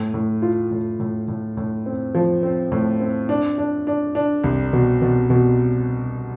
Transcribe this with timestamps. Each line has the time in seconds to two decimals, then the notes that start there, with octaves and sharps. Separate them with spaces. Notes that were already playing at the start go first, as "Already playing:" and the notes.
Already playing: A2
0.14 A2
0.42 F4
0.71 A2
1.00 A2
1.28 A2
1.57 A2
1.86 C4
2.15 F3
2.43 C4
2.72 A2
3.00 C4
3.29 D4
3.58 D4
3.87 D4
4.15 D4
4.44 C2
4.73 B2
5.02 B2
5.30 B2